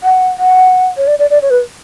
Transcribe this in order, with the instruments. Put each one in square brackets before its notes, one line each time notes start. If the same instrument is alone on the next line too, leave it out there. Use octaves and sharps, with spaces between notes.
[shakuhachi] F#5
F#5
C#5
D5
D5
D5
C#5
B4